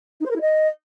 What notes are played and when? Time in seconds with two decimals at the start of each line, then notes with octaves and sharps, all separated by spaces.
0.20 D#4
0.25 C5
0.30 A#4
0.35 E4
0.41 D#5